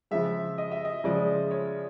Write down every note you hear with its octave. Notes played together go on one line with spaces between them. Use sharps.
C#3 F3 G#3 E5
D#5
E5
D#5
C#3 F3 G#3 D5
C#5